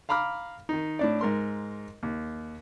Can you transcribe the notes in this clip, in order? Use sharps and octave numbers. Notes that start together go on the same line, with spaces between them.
F5 A#5 B5 D6 F6
D#3 D#4
A2 D4 D5
G#2 A#4 C6
D#2